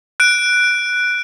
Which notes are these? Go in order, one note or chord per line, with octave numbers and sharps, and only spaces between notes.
F#6 D7